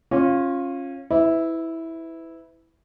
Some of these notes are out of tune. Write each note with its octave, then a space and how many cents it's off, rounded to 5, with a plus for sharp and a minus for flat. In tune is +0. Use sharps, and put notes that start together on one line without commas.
C#4 -25 F4 +0
E4 -10 B4 +30